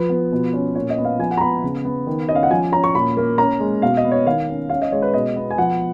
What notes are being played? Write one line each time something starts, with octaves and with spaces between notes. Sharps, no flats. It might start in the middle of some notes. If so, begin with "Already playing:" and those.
Already playing: F3 B4
B3
B2
C#4
A#2 C#5
D#5
B3
F5
F3 G#5
F#5
A#5
B3 B5
C#3
B3
D#3
C#4 D#5
F5
F#5
F3 G#5
C#4 A#5
C#6
A#2 B5
A#3
C#4 A#5
G#3
B2 F5
D#5
B3
C#5
D#3 F5
C#4
C#4 F5
D#5
G#3 C#5
B4
B2 D#5
B3
G#5
F3 F#5